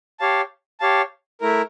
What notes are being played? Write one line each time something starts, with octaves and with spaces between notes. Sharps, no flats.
G4 C#5 F5 A5
G4 C#5 F5 A5
A3 E4 A#4